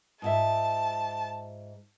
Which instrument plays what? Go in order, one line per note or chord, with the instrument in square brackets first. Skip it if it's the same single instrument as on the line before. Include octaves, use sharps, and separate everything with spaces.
[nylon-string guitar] G#2 F4 E5 [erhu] A5